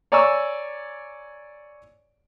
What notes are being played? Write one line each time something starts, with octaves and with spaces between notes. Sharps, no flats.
C#5 D5 G#5 A#5 C#6 E6